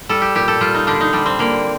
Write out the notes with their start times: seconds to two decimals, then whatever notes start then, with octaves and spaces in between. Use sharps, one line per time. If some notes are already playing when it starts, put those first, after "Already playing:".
0.09 G3 A4
0.22 G4
0.35 A#2 G4
0.48 A4
0.61 G3 F4
0.75 D#4
0.87 D3 D4
1.01 D#4
1.13 G3 D4
1.26 C4
1.39 D3 A#3